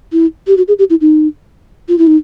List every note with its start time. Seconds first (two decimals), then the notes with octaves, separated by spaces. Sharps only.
0.12 E4
0.47 G4
0.57 F#4
0.68 G#4
0.79 G4
0.90 E4
1.01 D#4
1.89 F4
1.98 E4
2.07 D#4